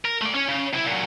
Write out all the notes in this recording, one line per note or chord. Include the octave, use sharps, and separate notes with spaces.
A#4
A3 D5
C#4 C#5
C#3
C3 E4
A#2 F#3